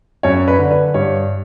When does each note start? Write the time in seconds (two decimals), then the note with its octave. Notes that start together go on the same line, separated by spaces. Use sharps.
0.23 F#2 C#5
0.48 B4
0.59 D3
0.71 B4
0.94 G2 C#5